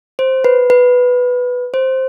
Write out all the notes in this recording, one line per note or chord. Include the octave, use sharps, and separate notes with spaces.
C5
B4
B4
C5